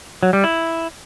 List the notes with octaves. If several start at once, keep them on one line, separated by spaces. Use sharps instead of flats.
F#3
G3
E4